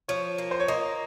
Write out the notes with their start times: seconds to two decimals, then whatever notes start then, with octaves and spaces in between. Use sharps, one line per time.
0.08 F3 C#5
0.38 A#3
0.51 C5
0.60 C#5
0.68 A#3 D#5